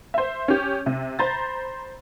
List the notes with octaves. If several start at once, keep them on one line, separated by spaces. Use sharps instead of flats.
C5 E5
C#4 G4
C3
C5 A#5 B5 A6